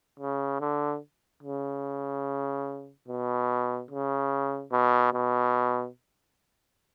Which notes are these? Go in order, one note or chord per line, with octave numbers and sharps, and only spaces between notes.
C#3
D3
C#3
B2
C#3
B2
B2